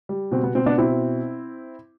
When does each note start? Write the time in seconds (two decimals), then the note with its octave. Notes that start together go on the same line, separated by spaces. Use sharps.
0.09 G3
0.32 B2 C4
0.43 B3
0.55 B2 C4
0.66 B3 D4
0.77 B2 C4 E4